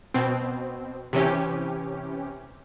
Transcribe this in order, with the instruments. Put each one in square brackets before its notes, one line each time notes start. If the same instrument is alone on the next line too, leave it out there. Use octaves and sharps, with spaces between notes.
[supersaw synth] B2 C4
C3 E3 C#4 G4